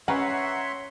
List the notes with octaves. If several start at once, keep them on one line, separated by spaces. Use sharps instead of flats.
C#4 A#4 B4 C#5 E5 F#5 A#5 C6